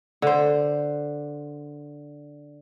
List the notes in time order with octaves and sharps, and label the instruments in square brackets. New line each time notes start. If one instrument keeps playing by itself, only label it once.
[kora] D3 C5